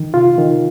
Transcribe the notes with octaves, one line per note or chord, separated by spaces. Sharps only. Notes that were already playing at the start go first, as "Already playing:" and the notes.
Already playing: D#3
C3 F4
D#3